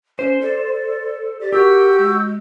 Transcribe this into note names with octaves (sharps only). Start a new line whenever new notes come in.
C#4 C5
A4 D5
G4 D5
F#4 G4 A#4 E6 G6
G#3